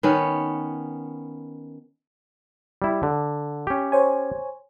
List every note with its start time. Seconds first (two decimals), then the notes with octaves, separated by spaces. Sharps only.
0.03 D#3 B3 C#4
2.82 G3 E4
3.03 D3
3.67 C#4 G4
3.92 C5 C#5 G#5